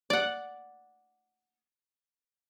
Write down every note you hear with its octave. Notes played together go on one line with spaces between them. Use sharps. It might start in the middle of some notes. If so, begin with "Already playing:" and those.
D5 F#5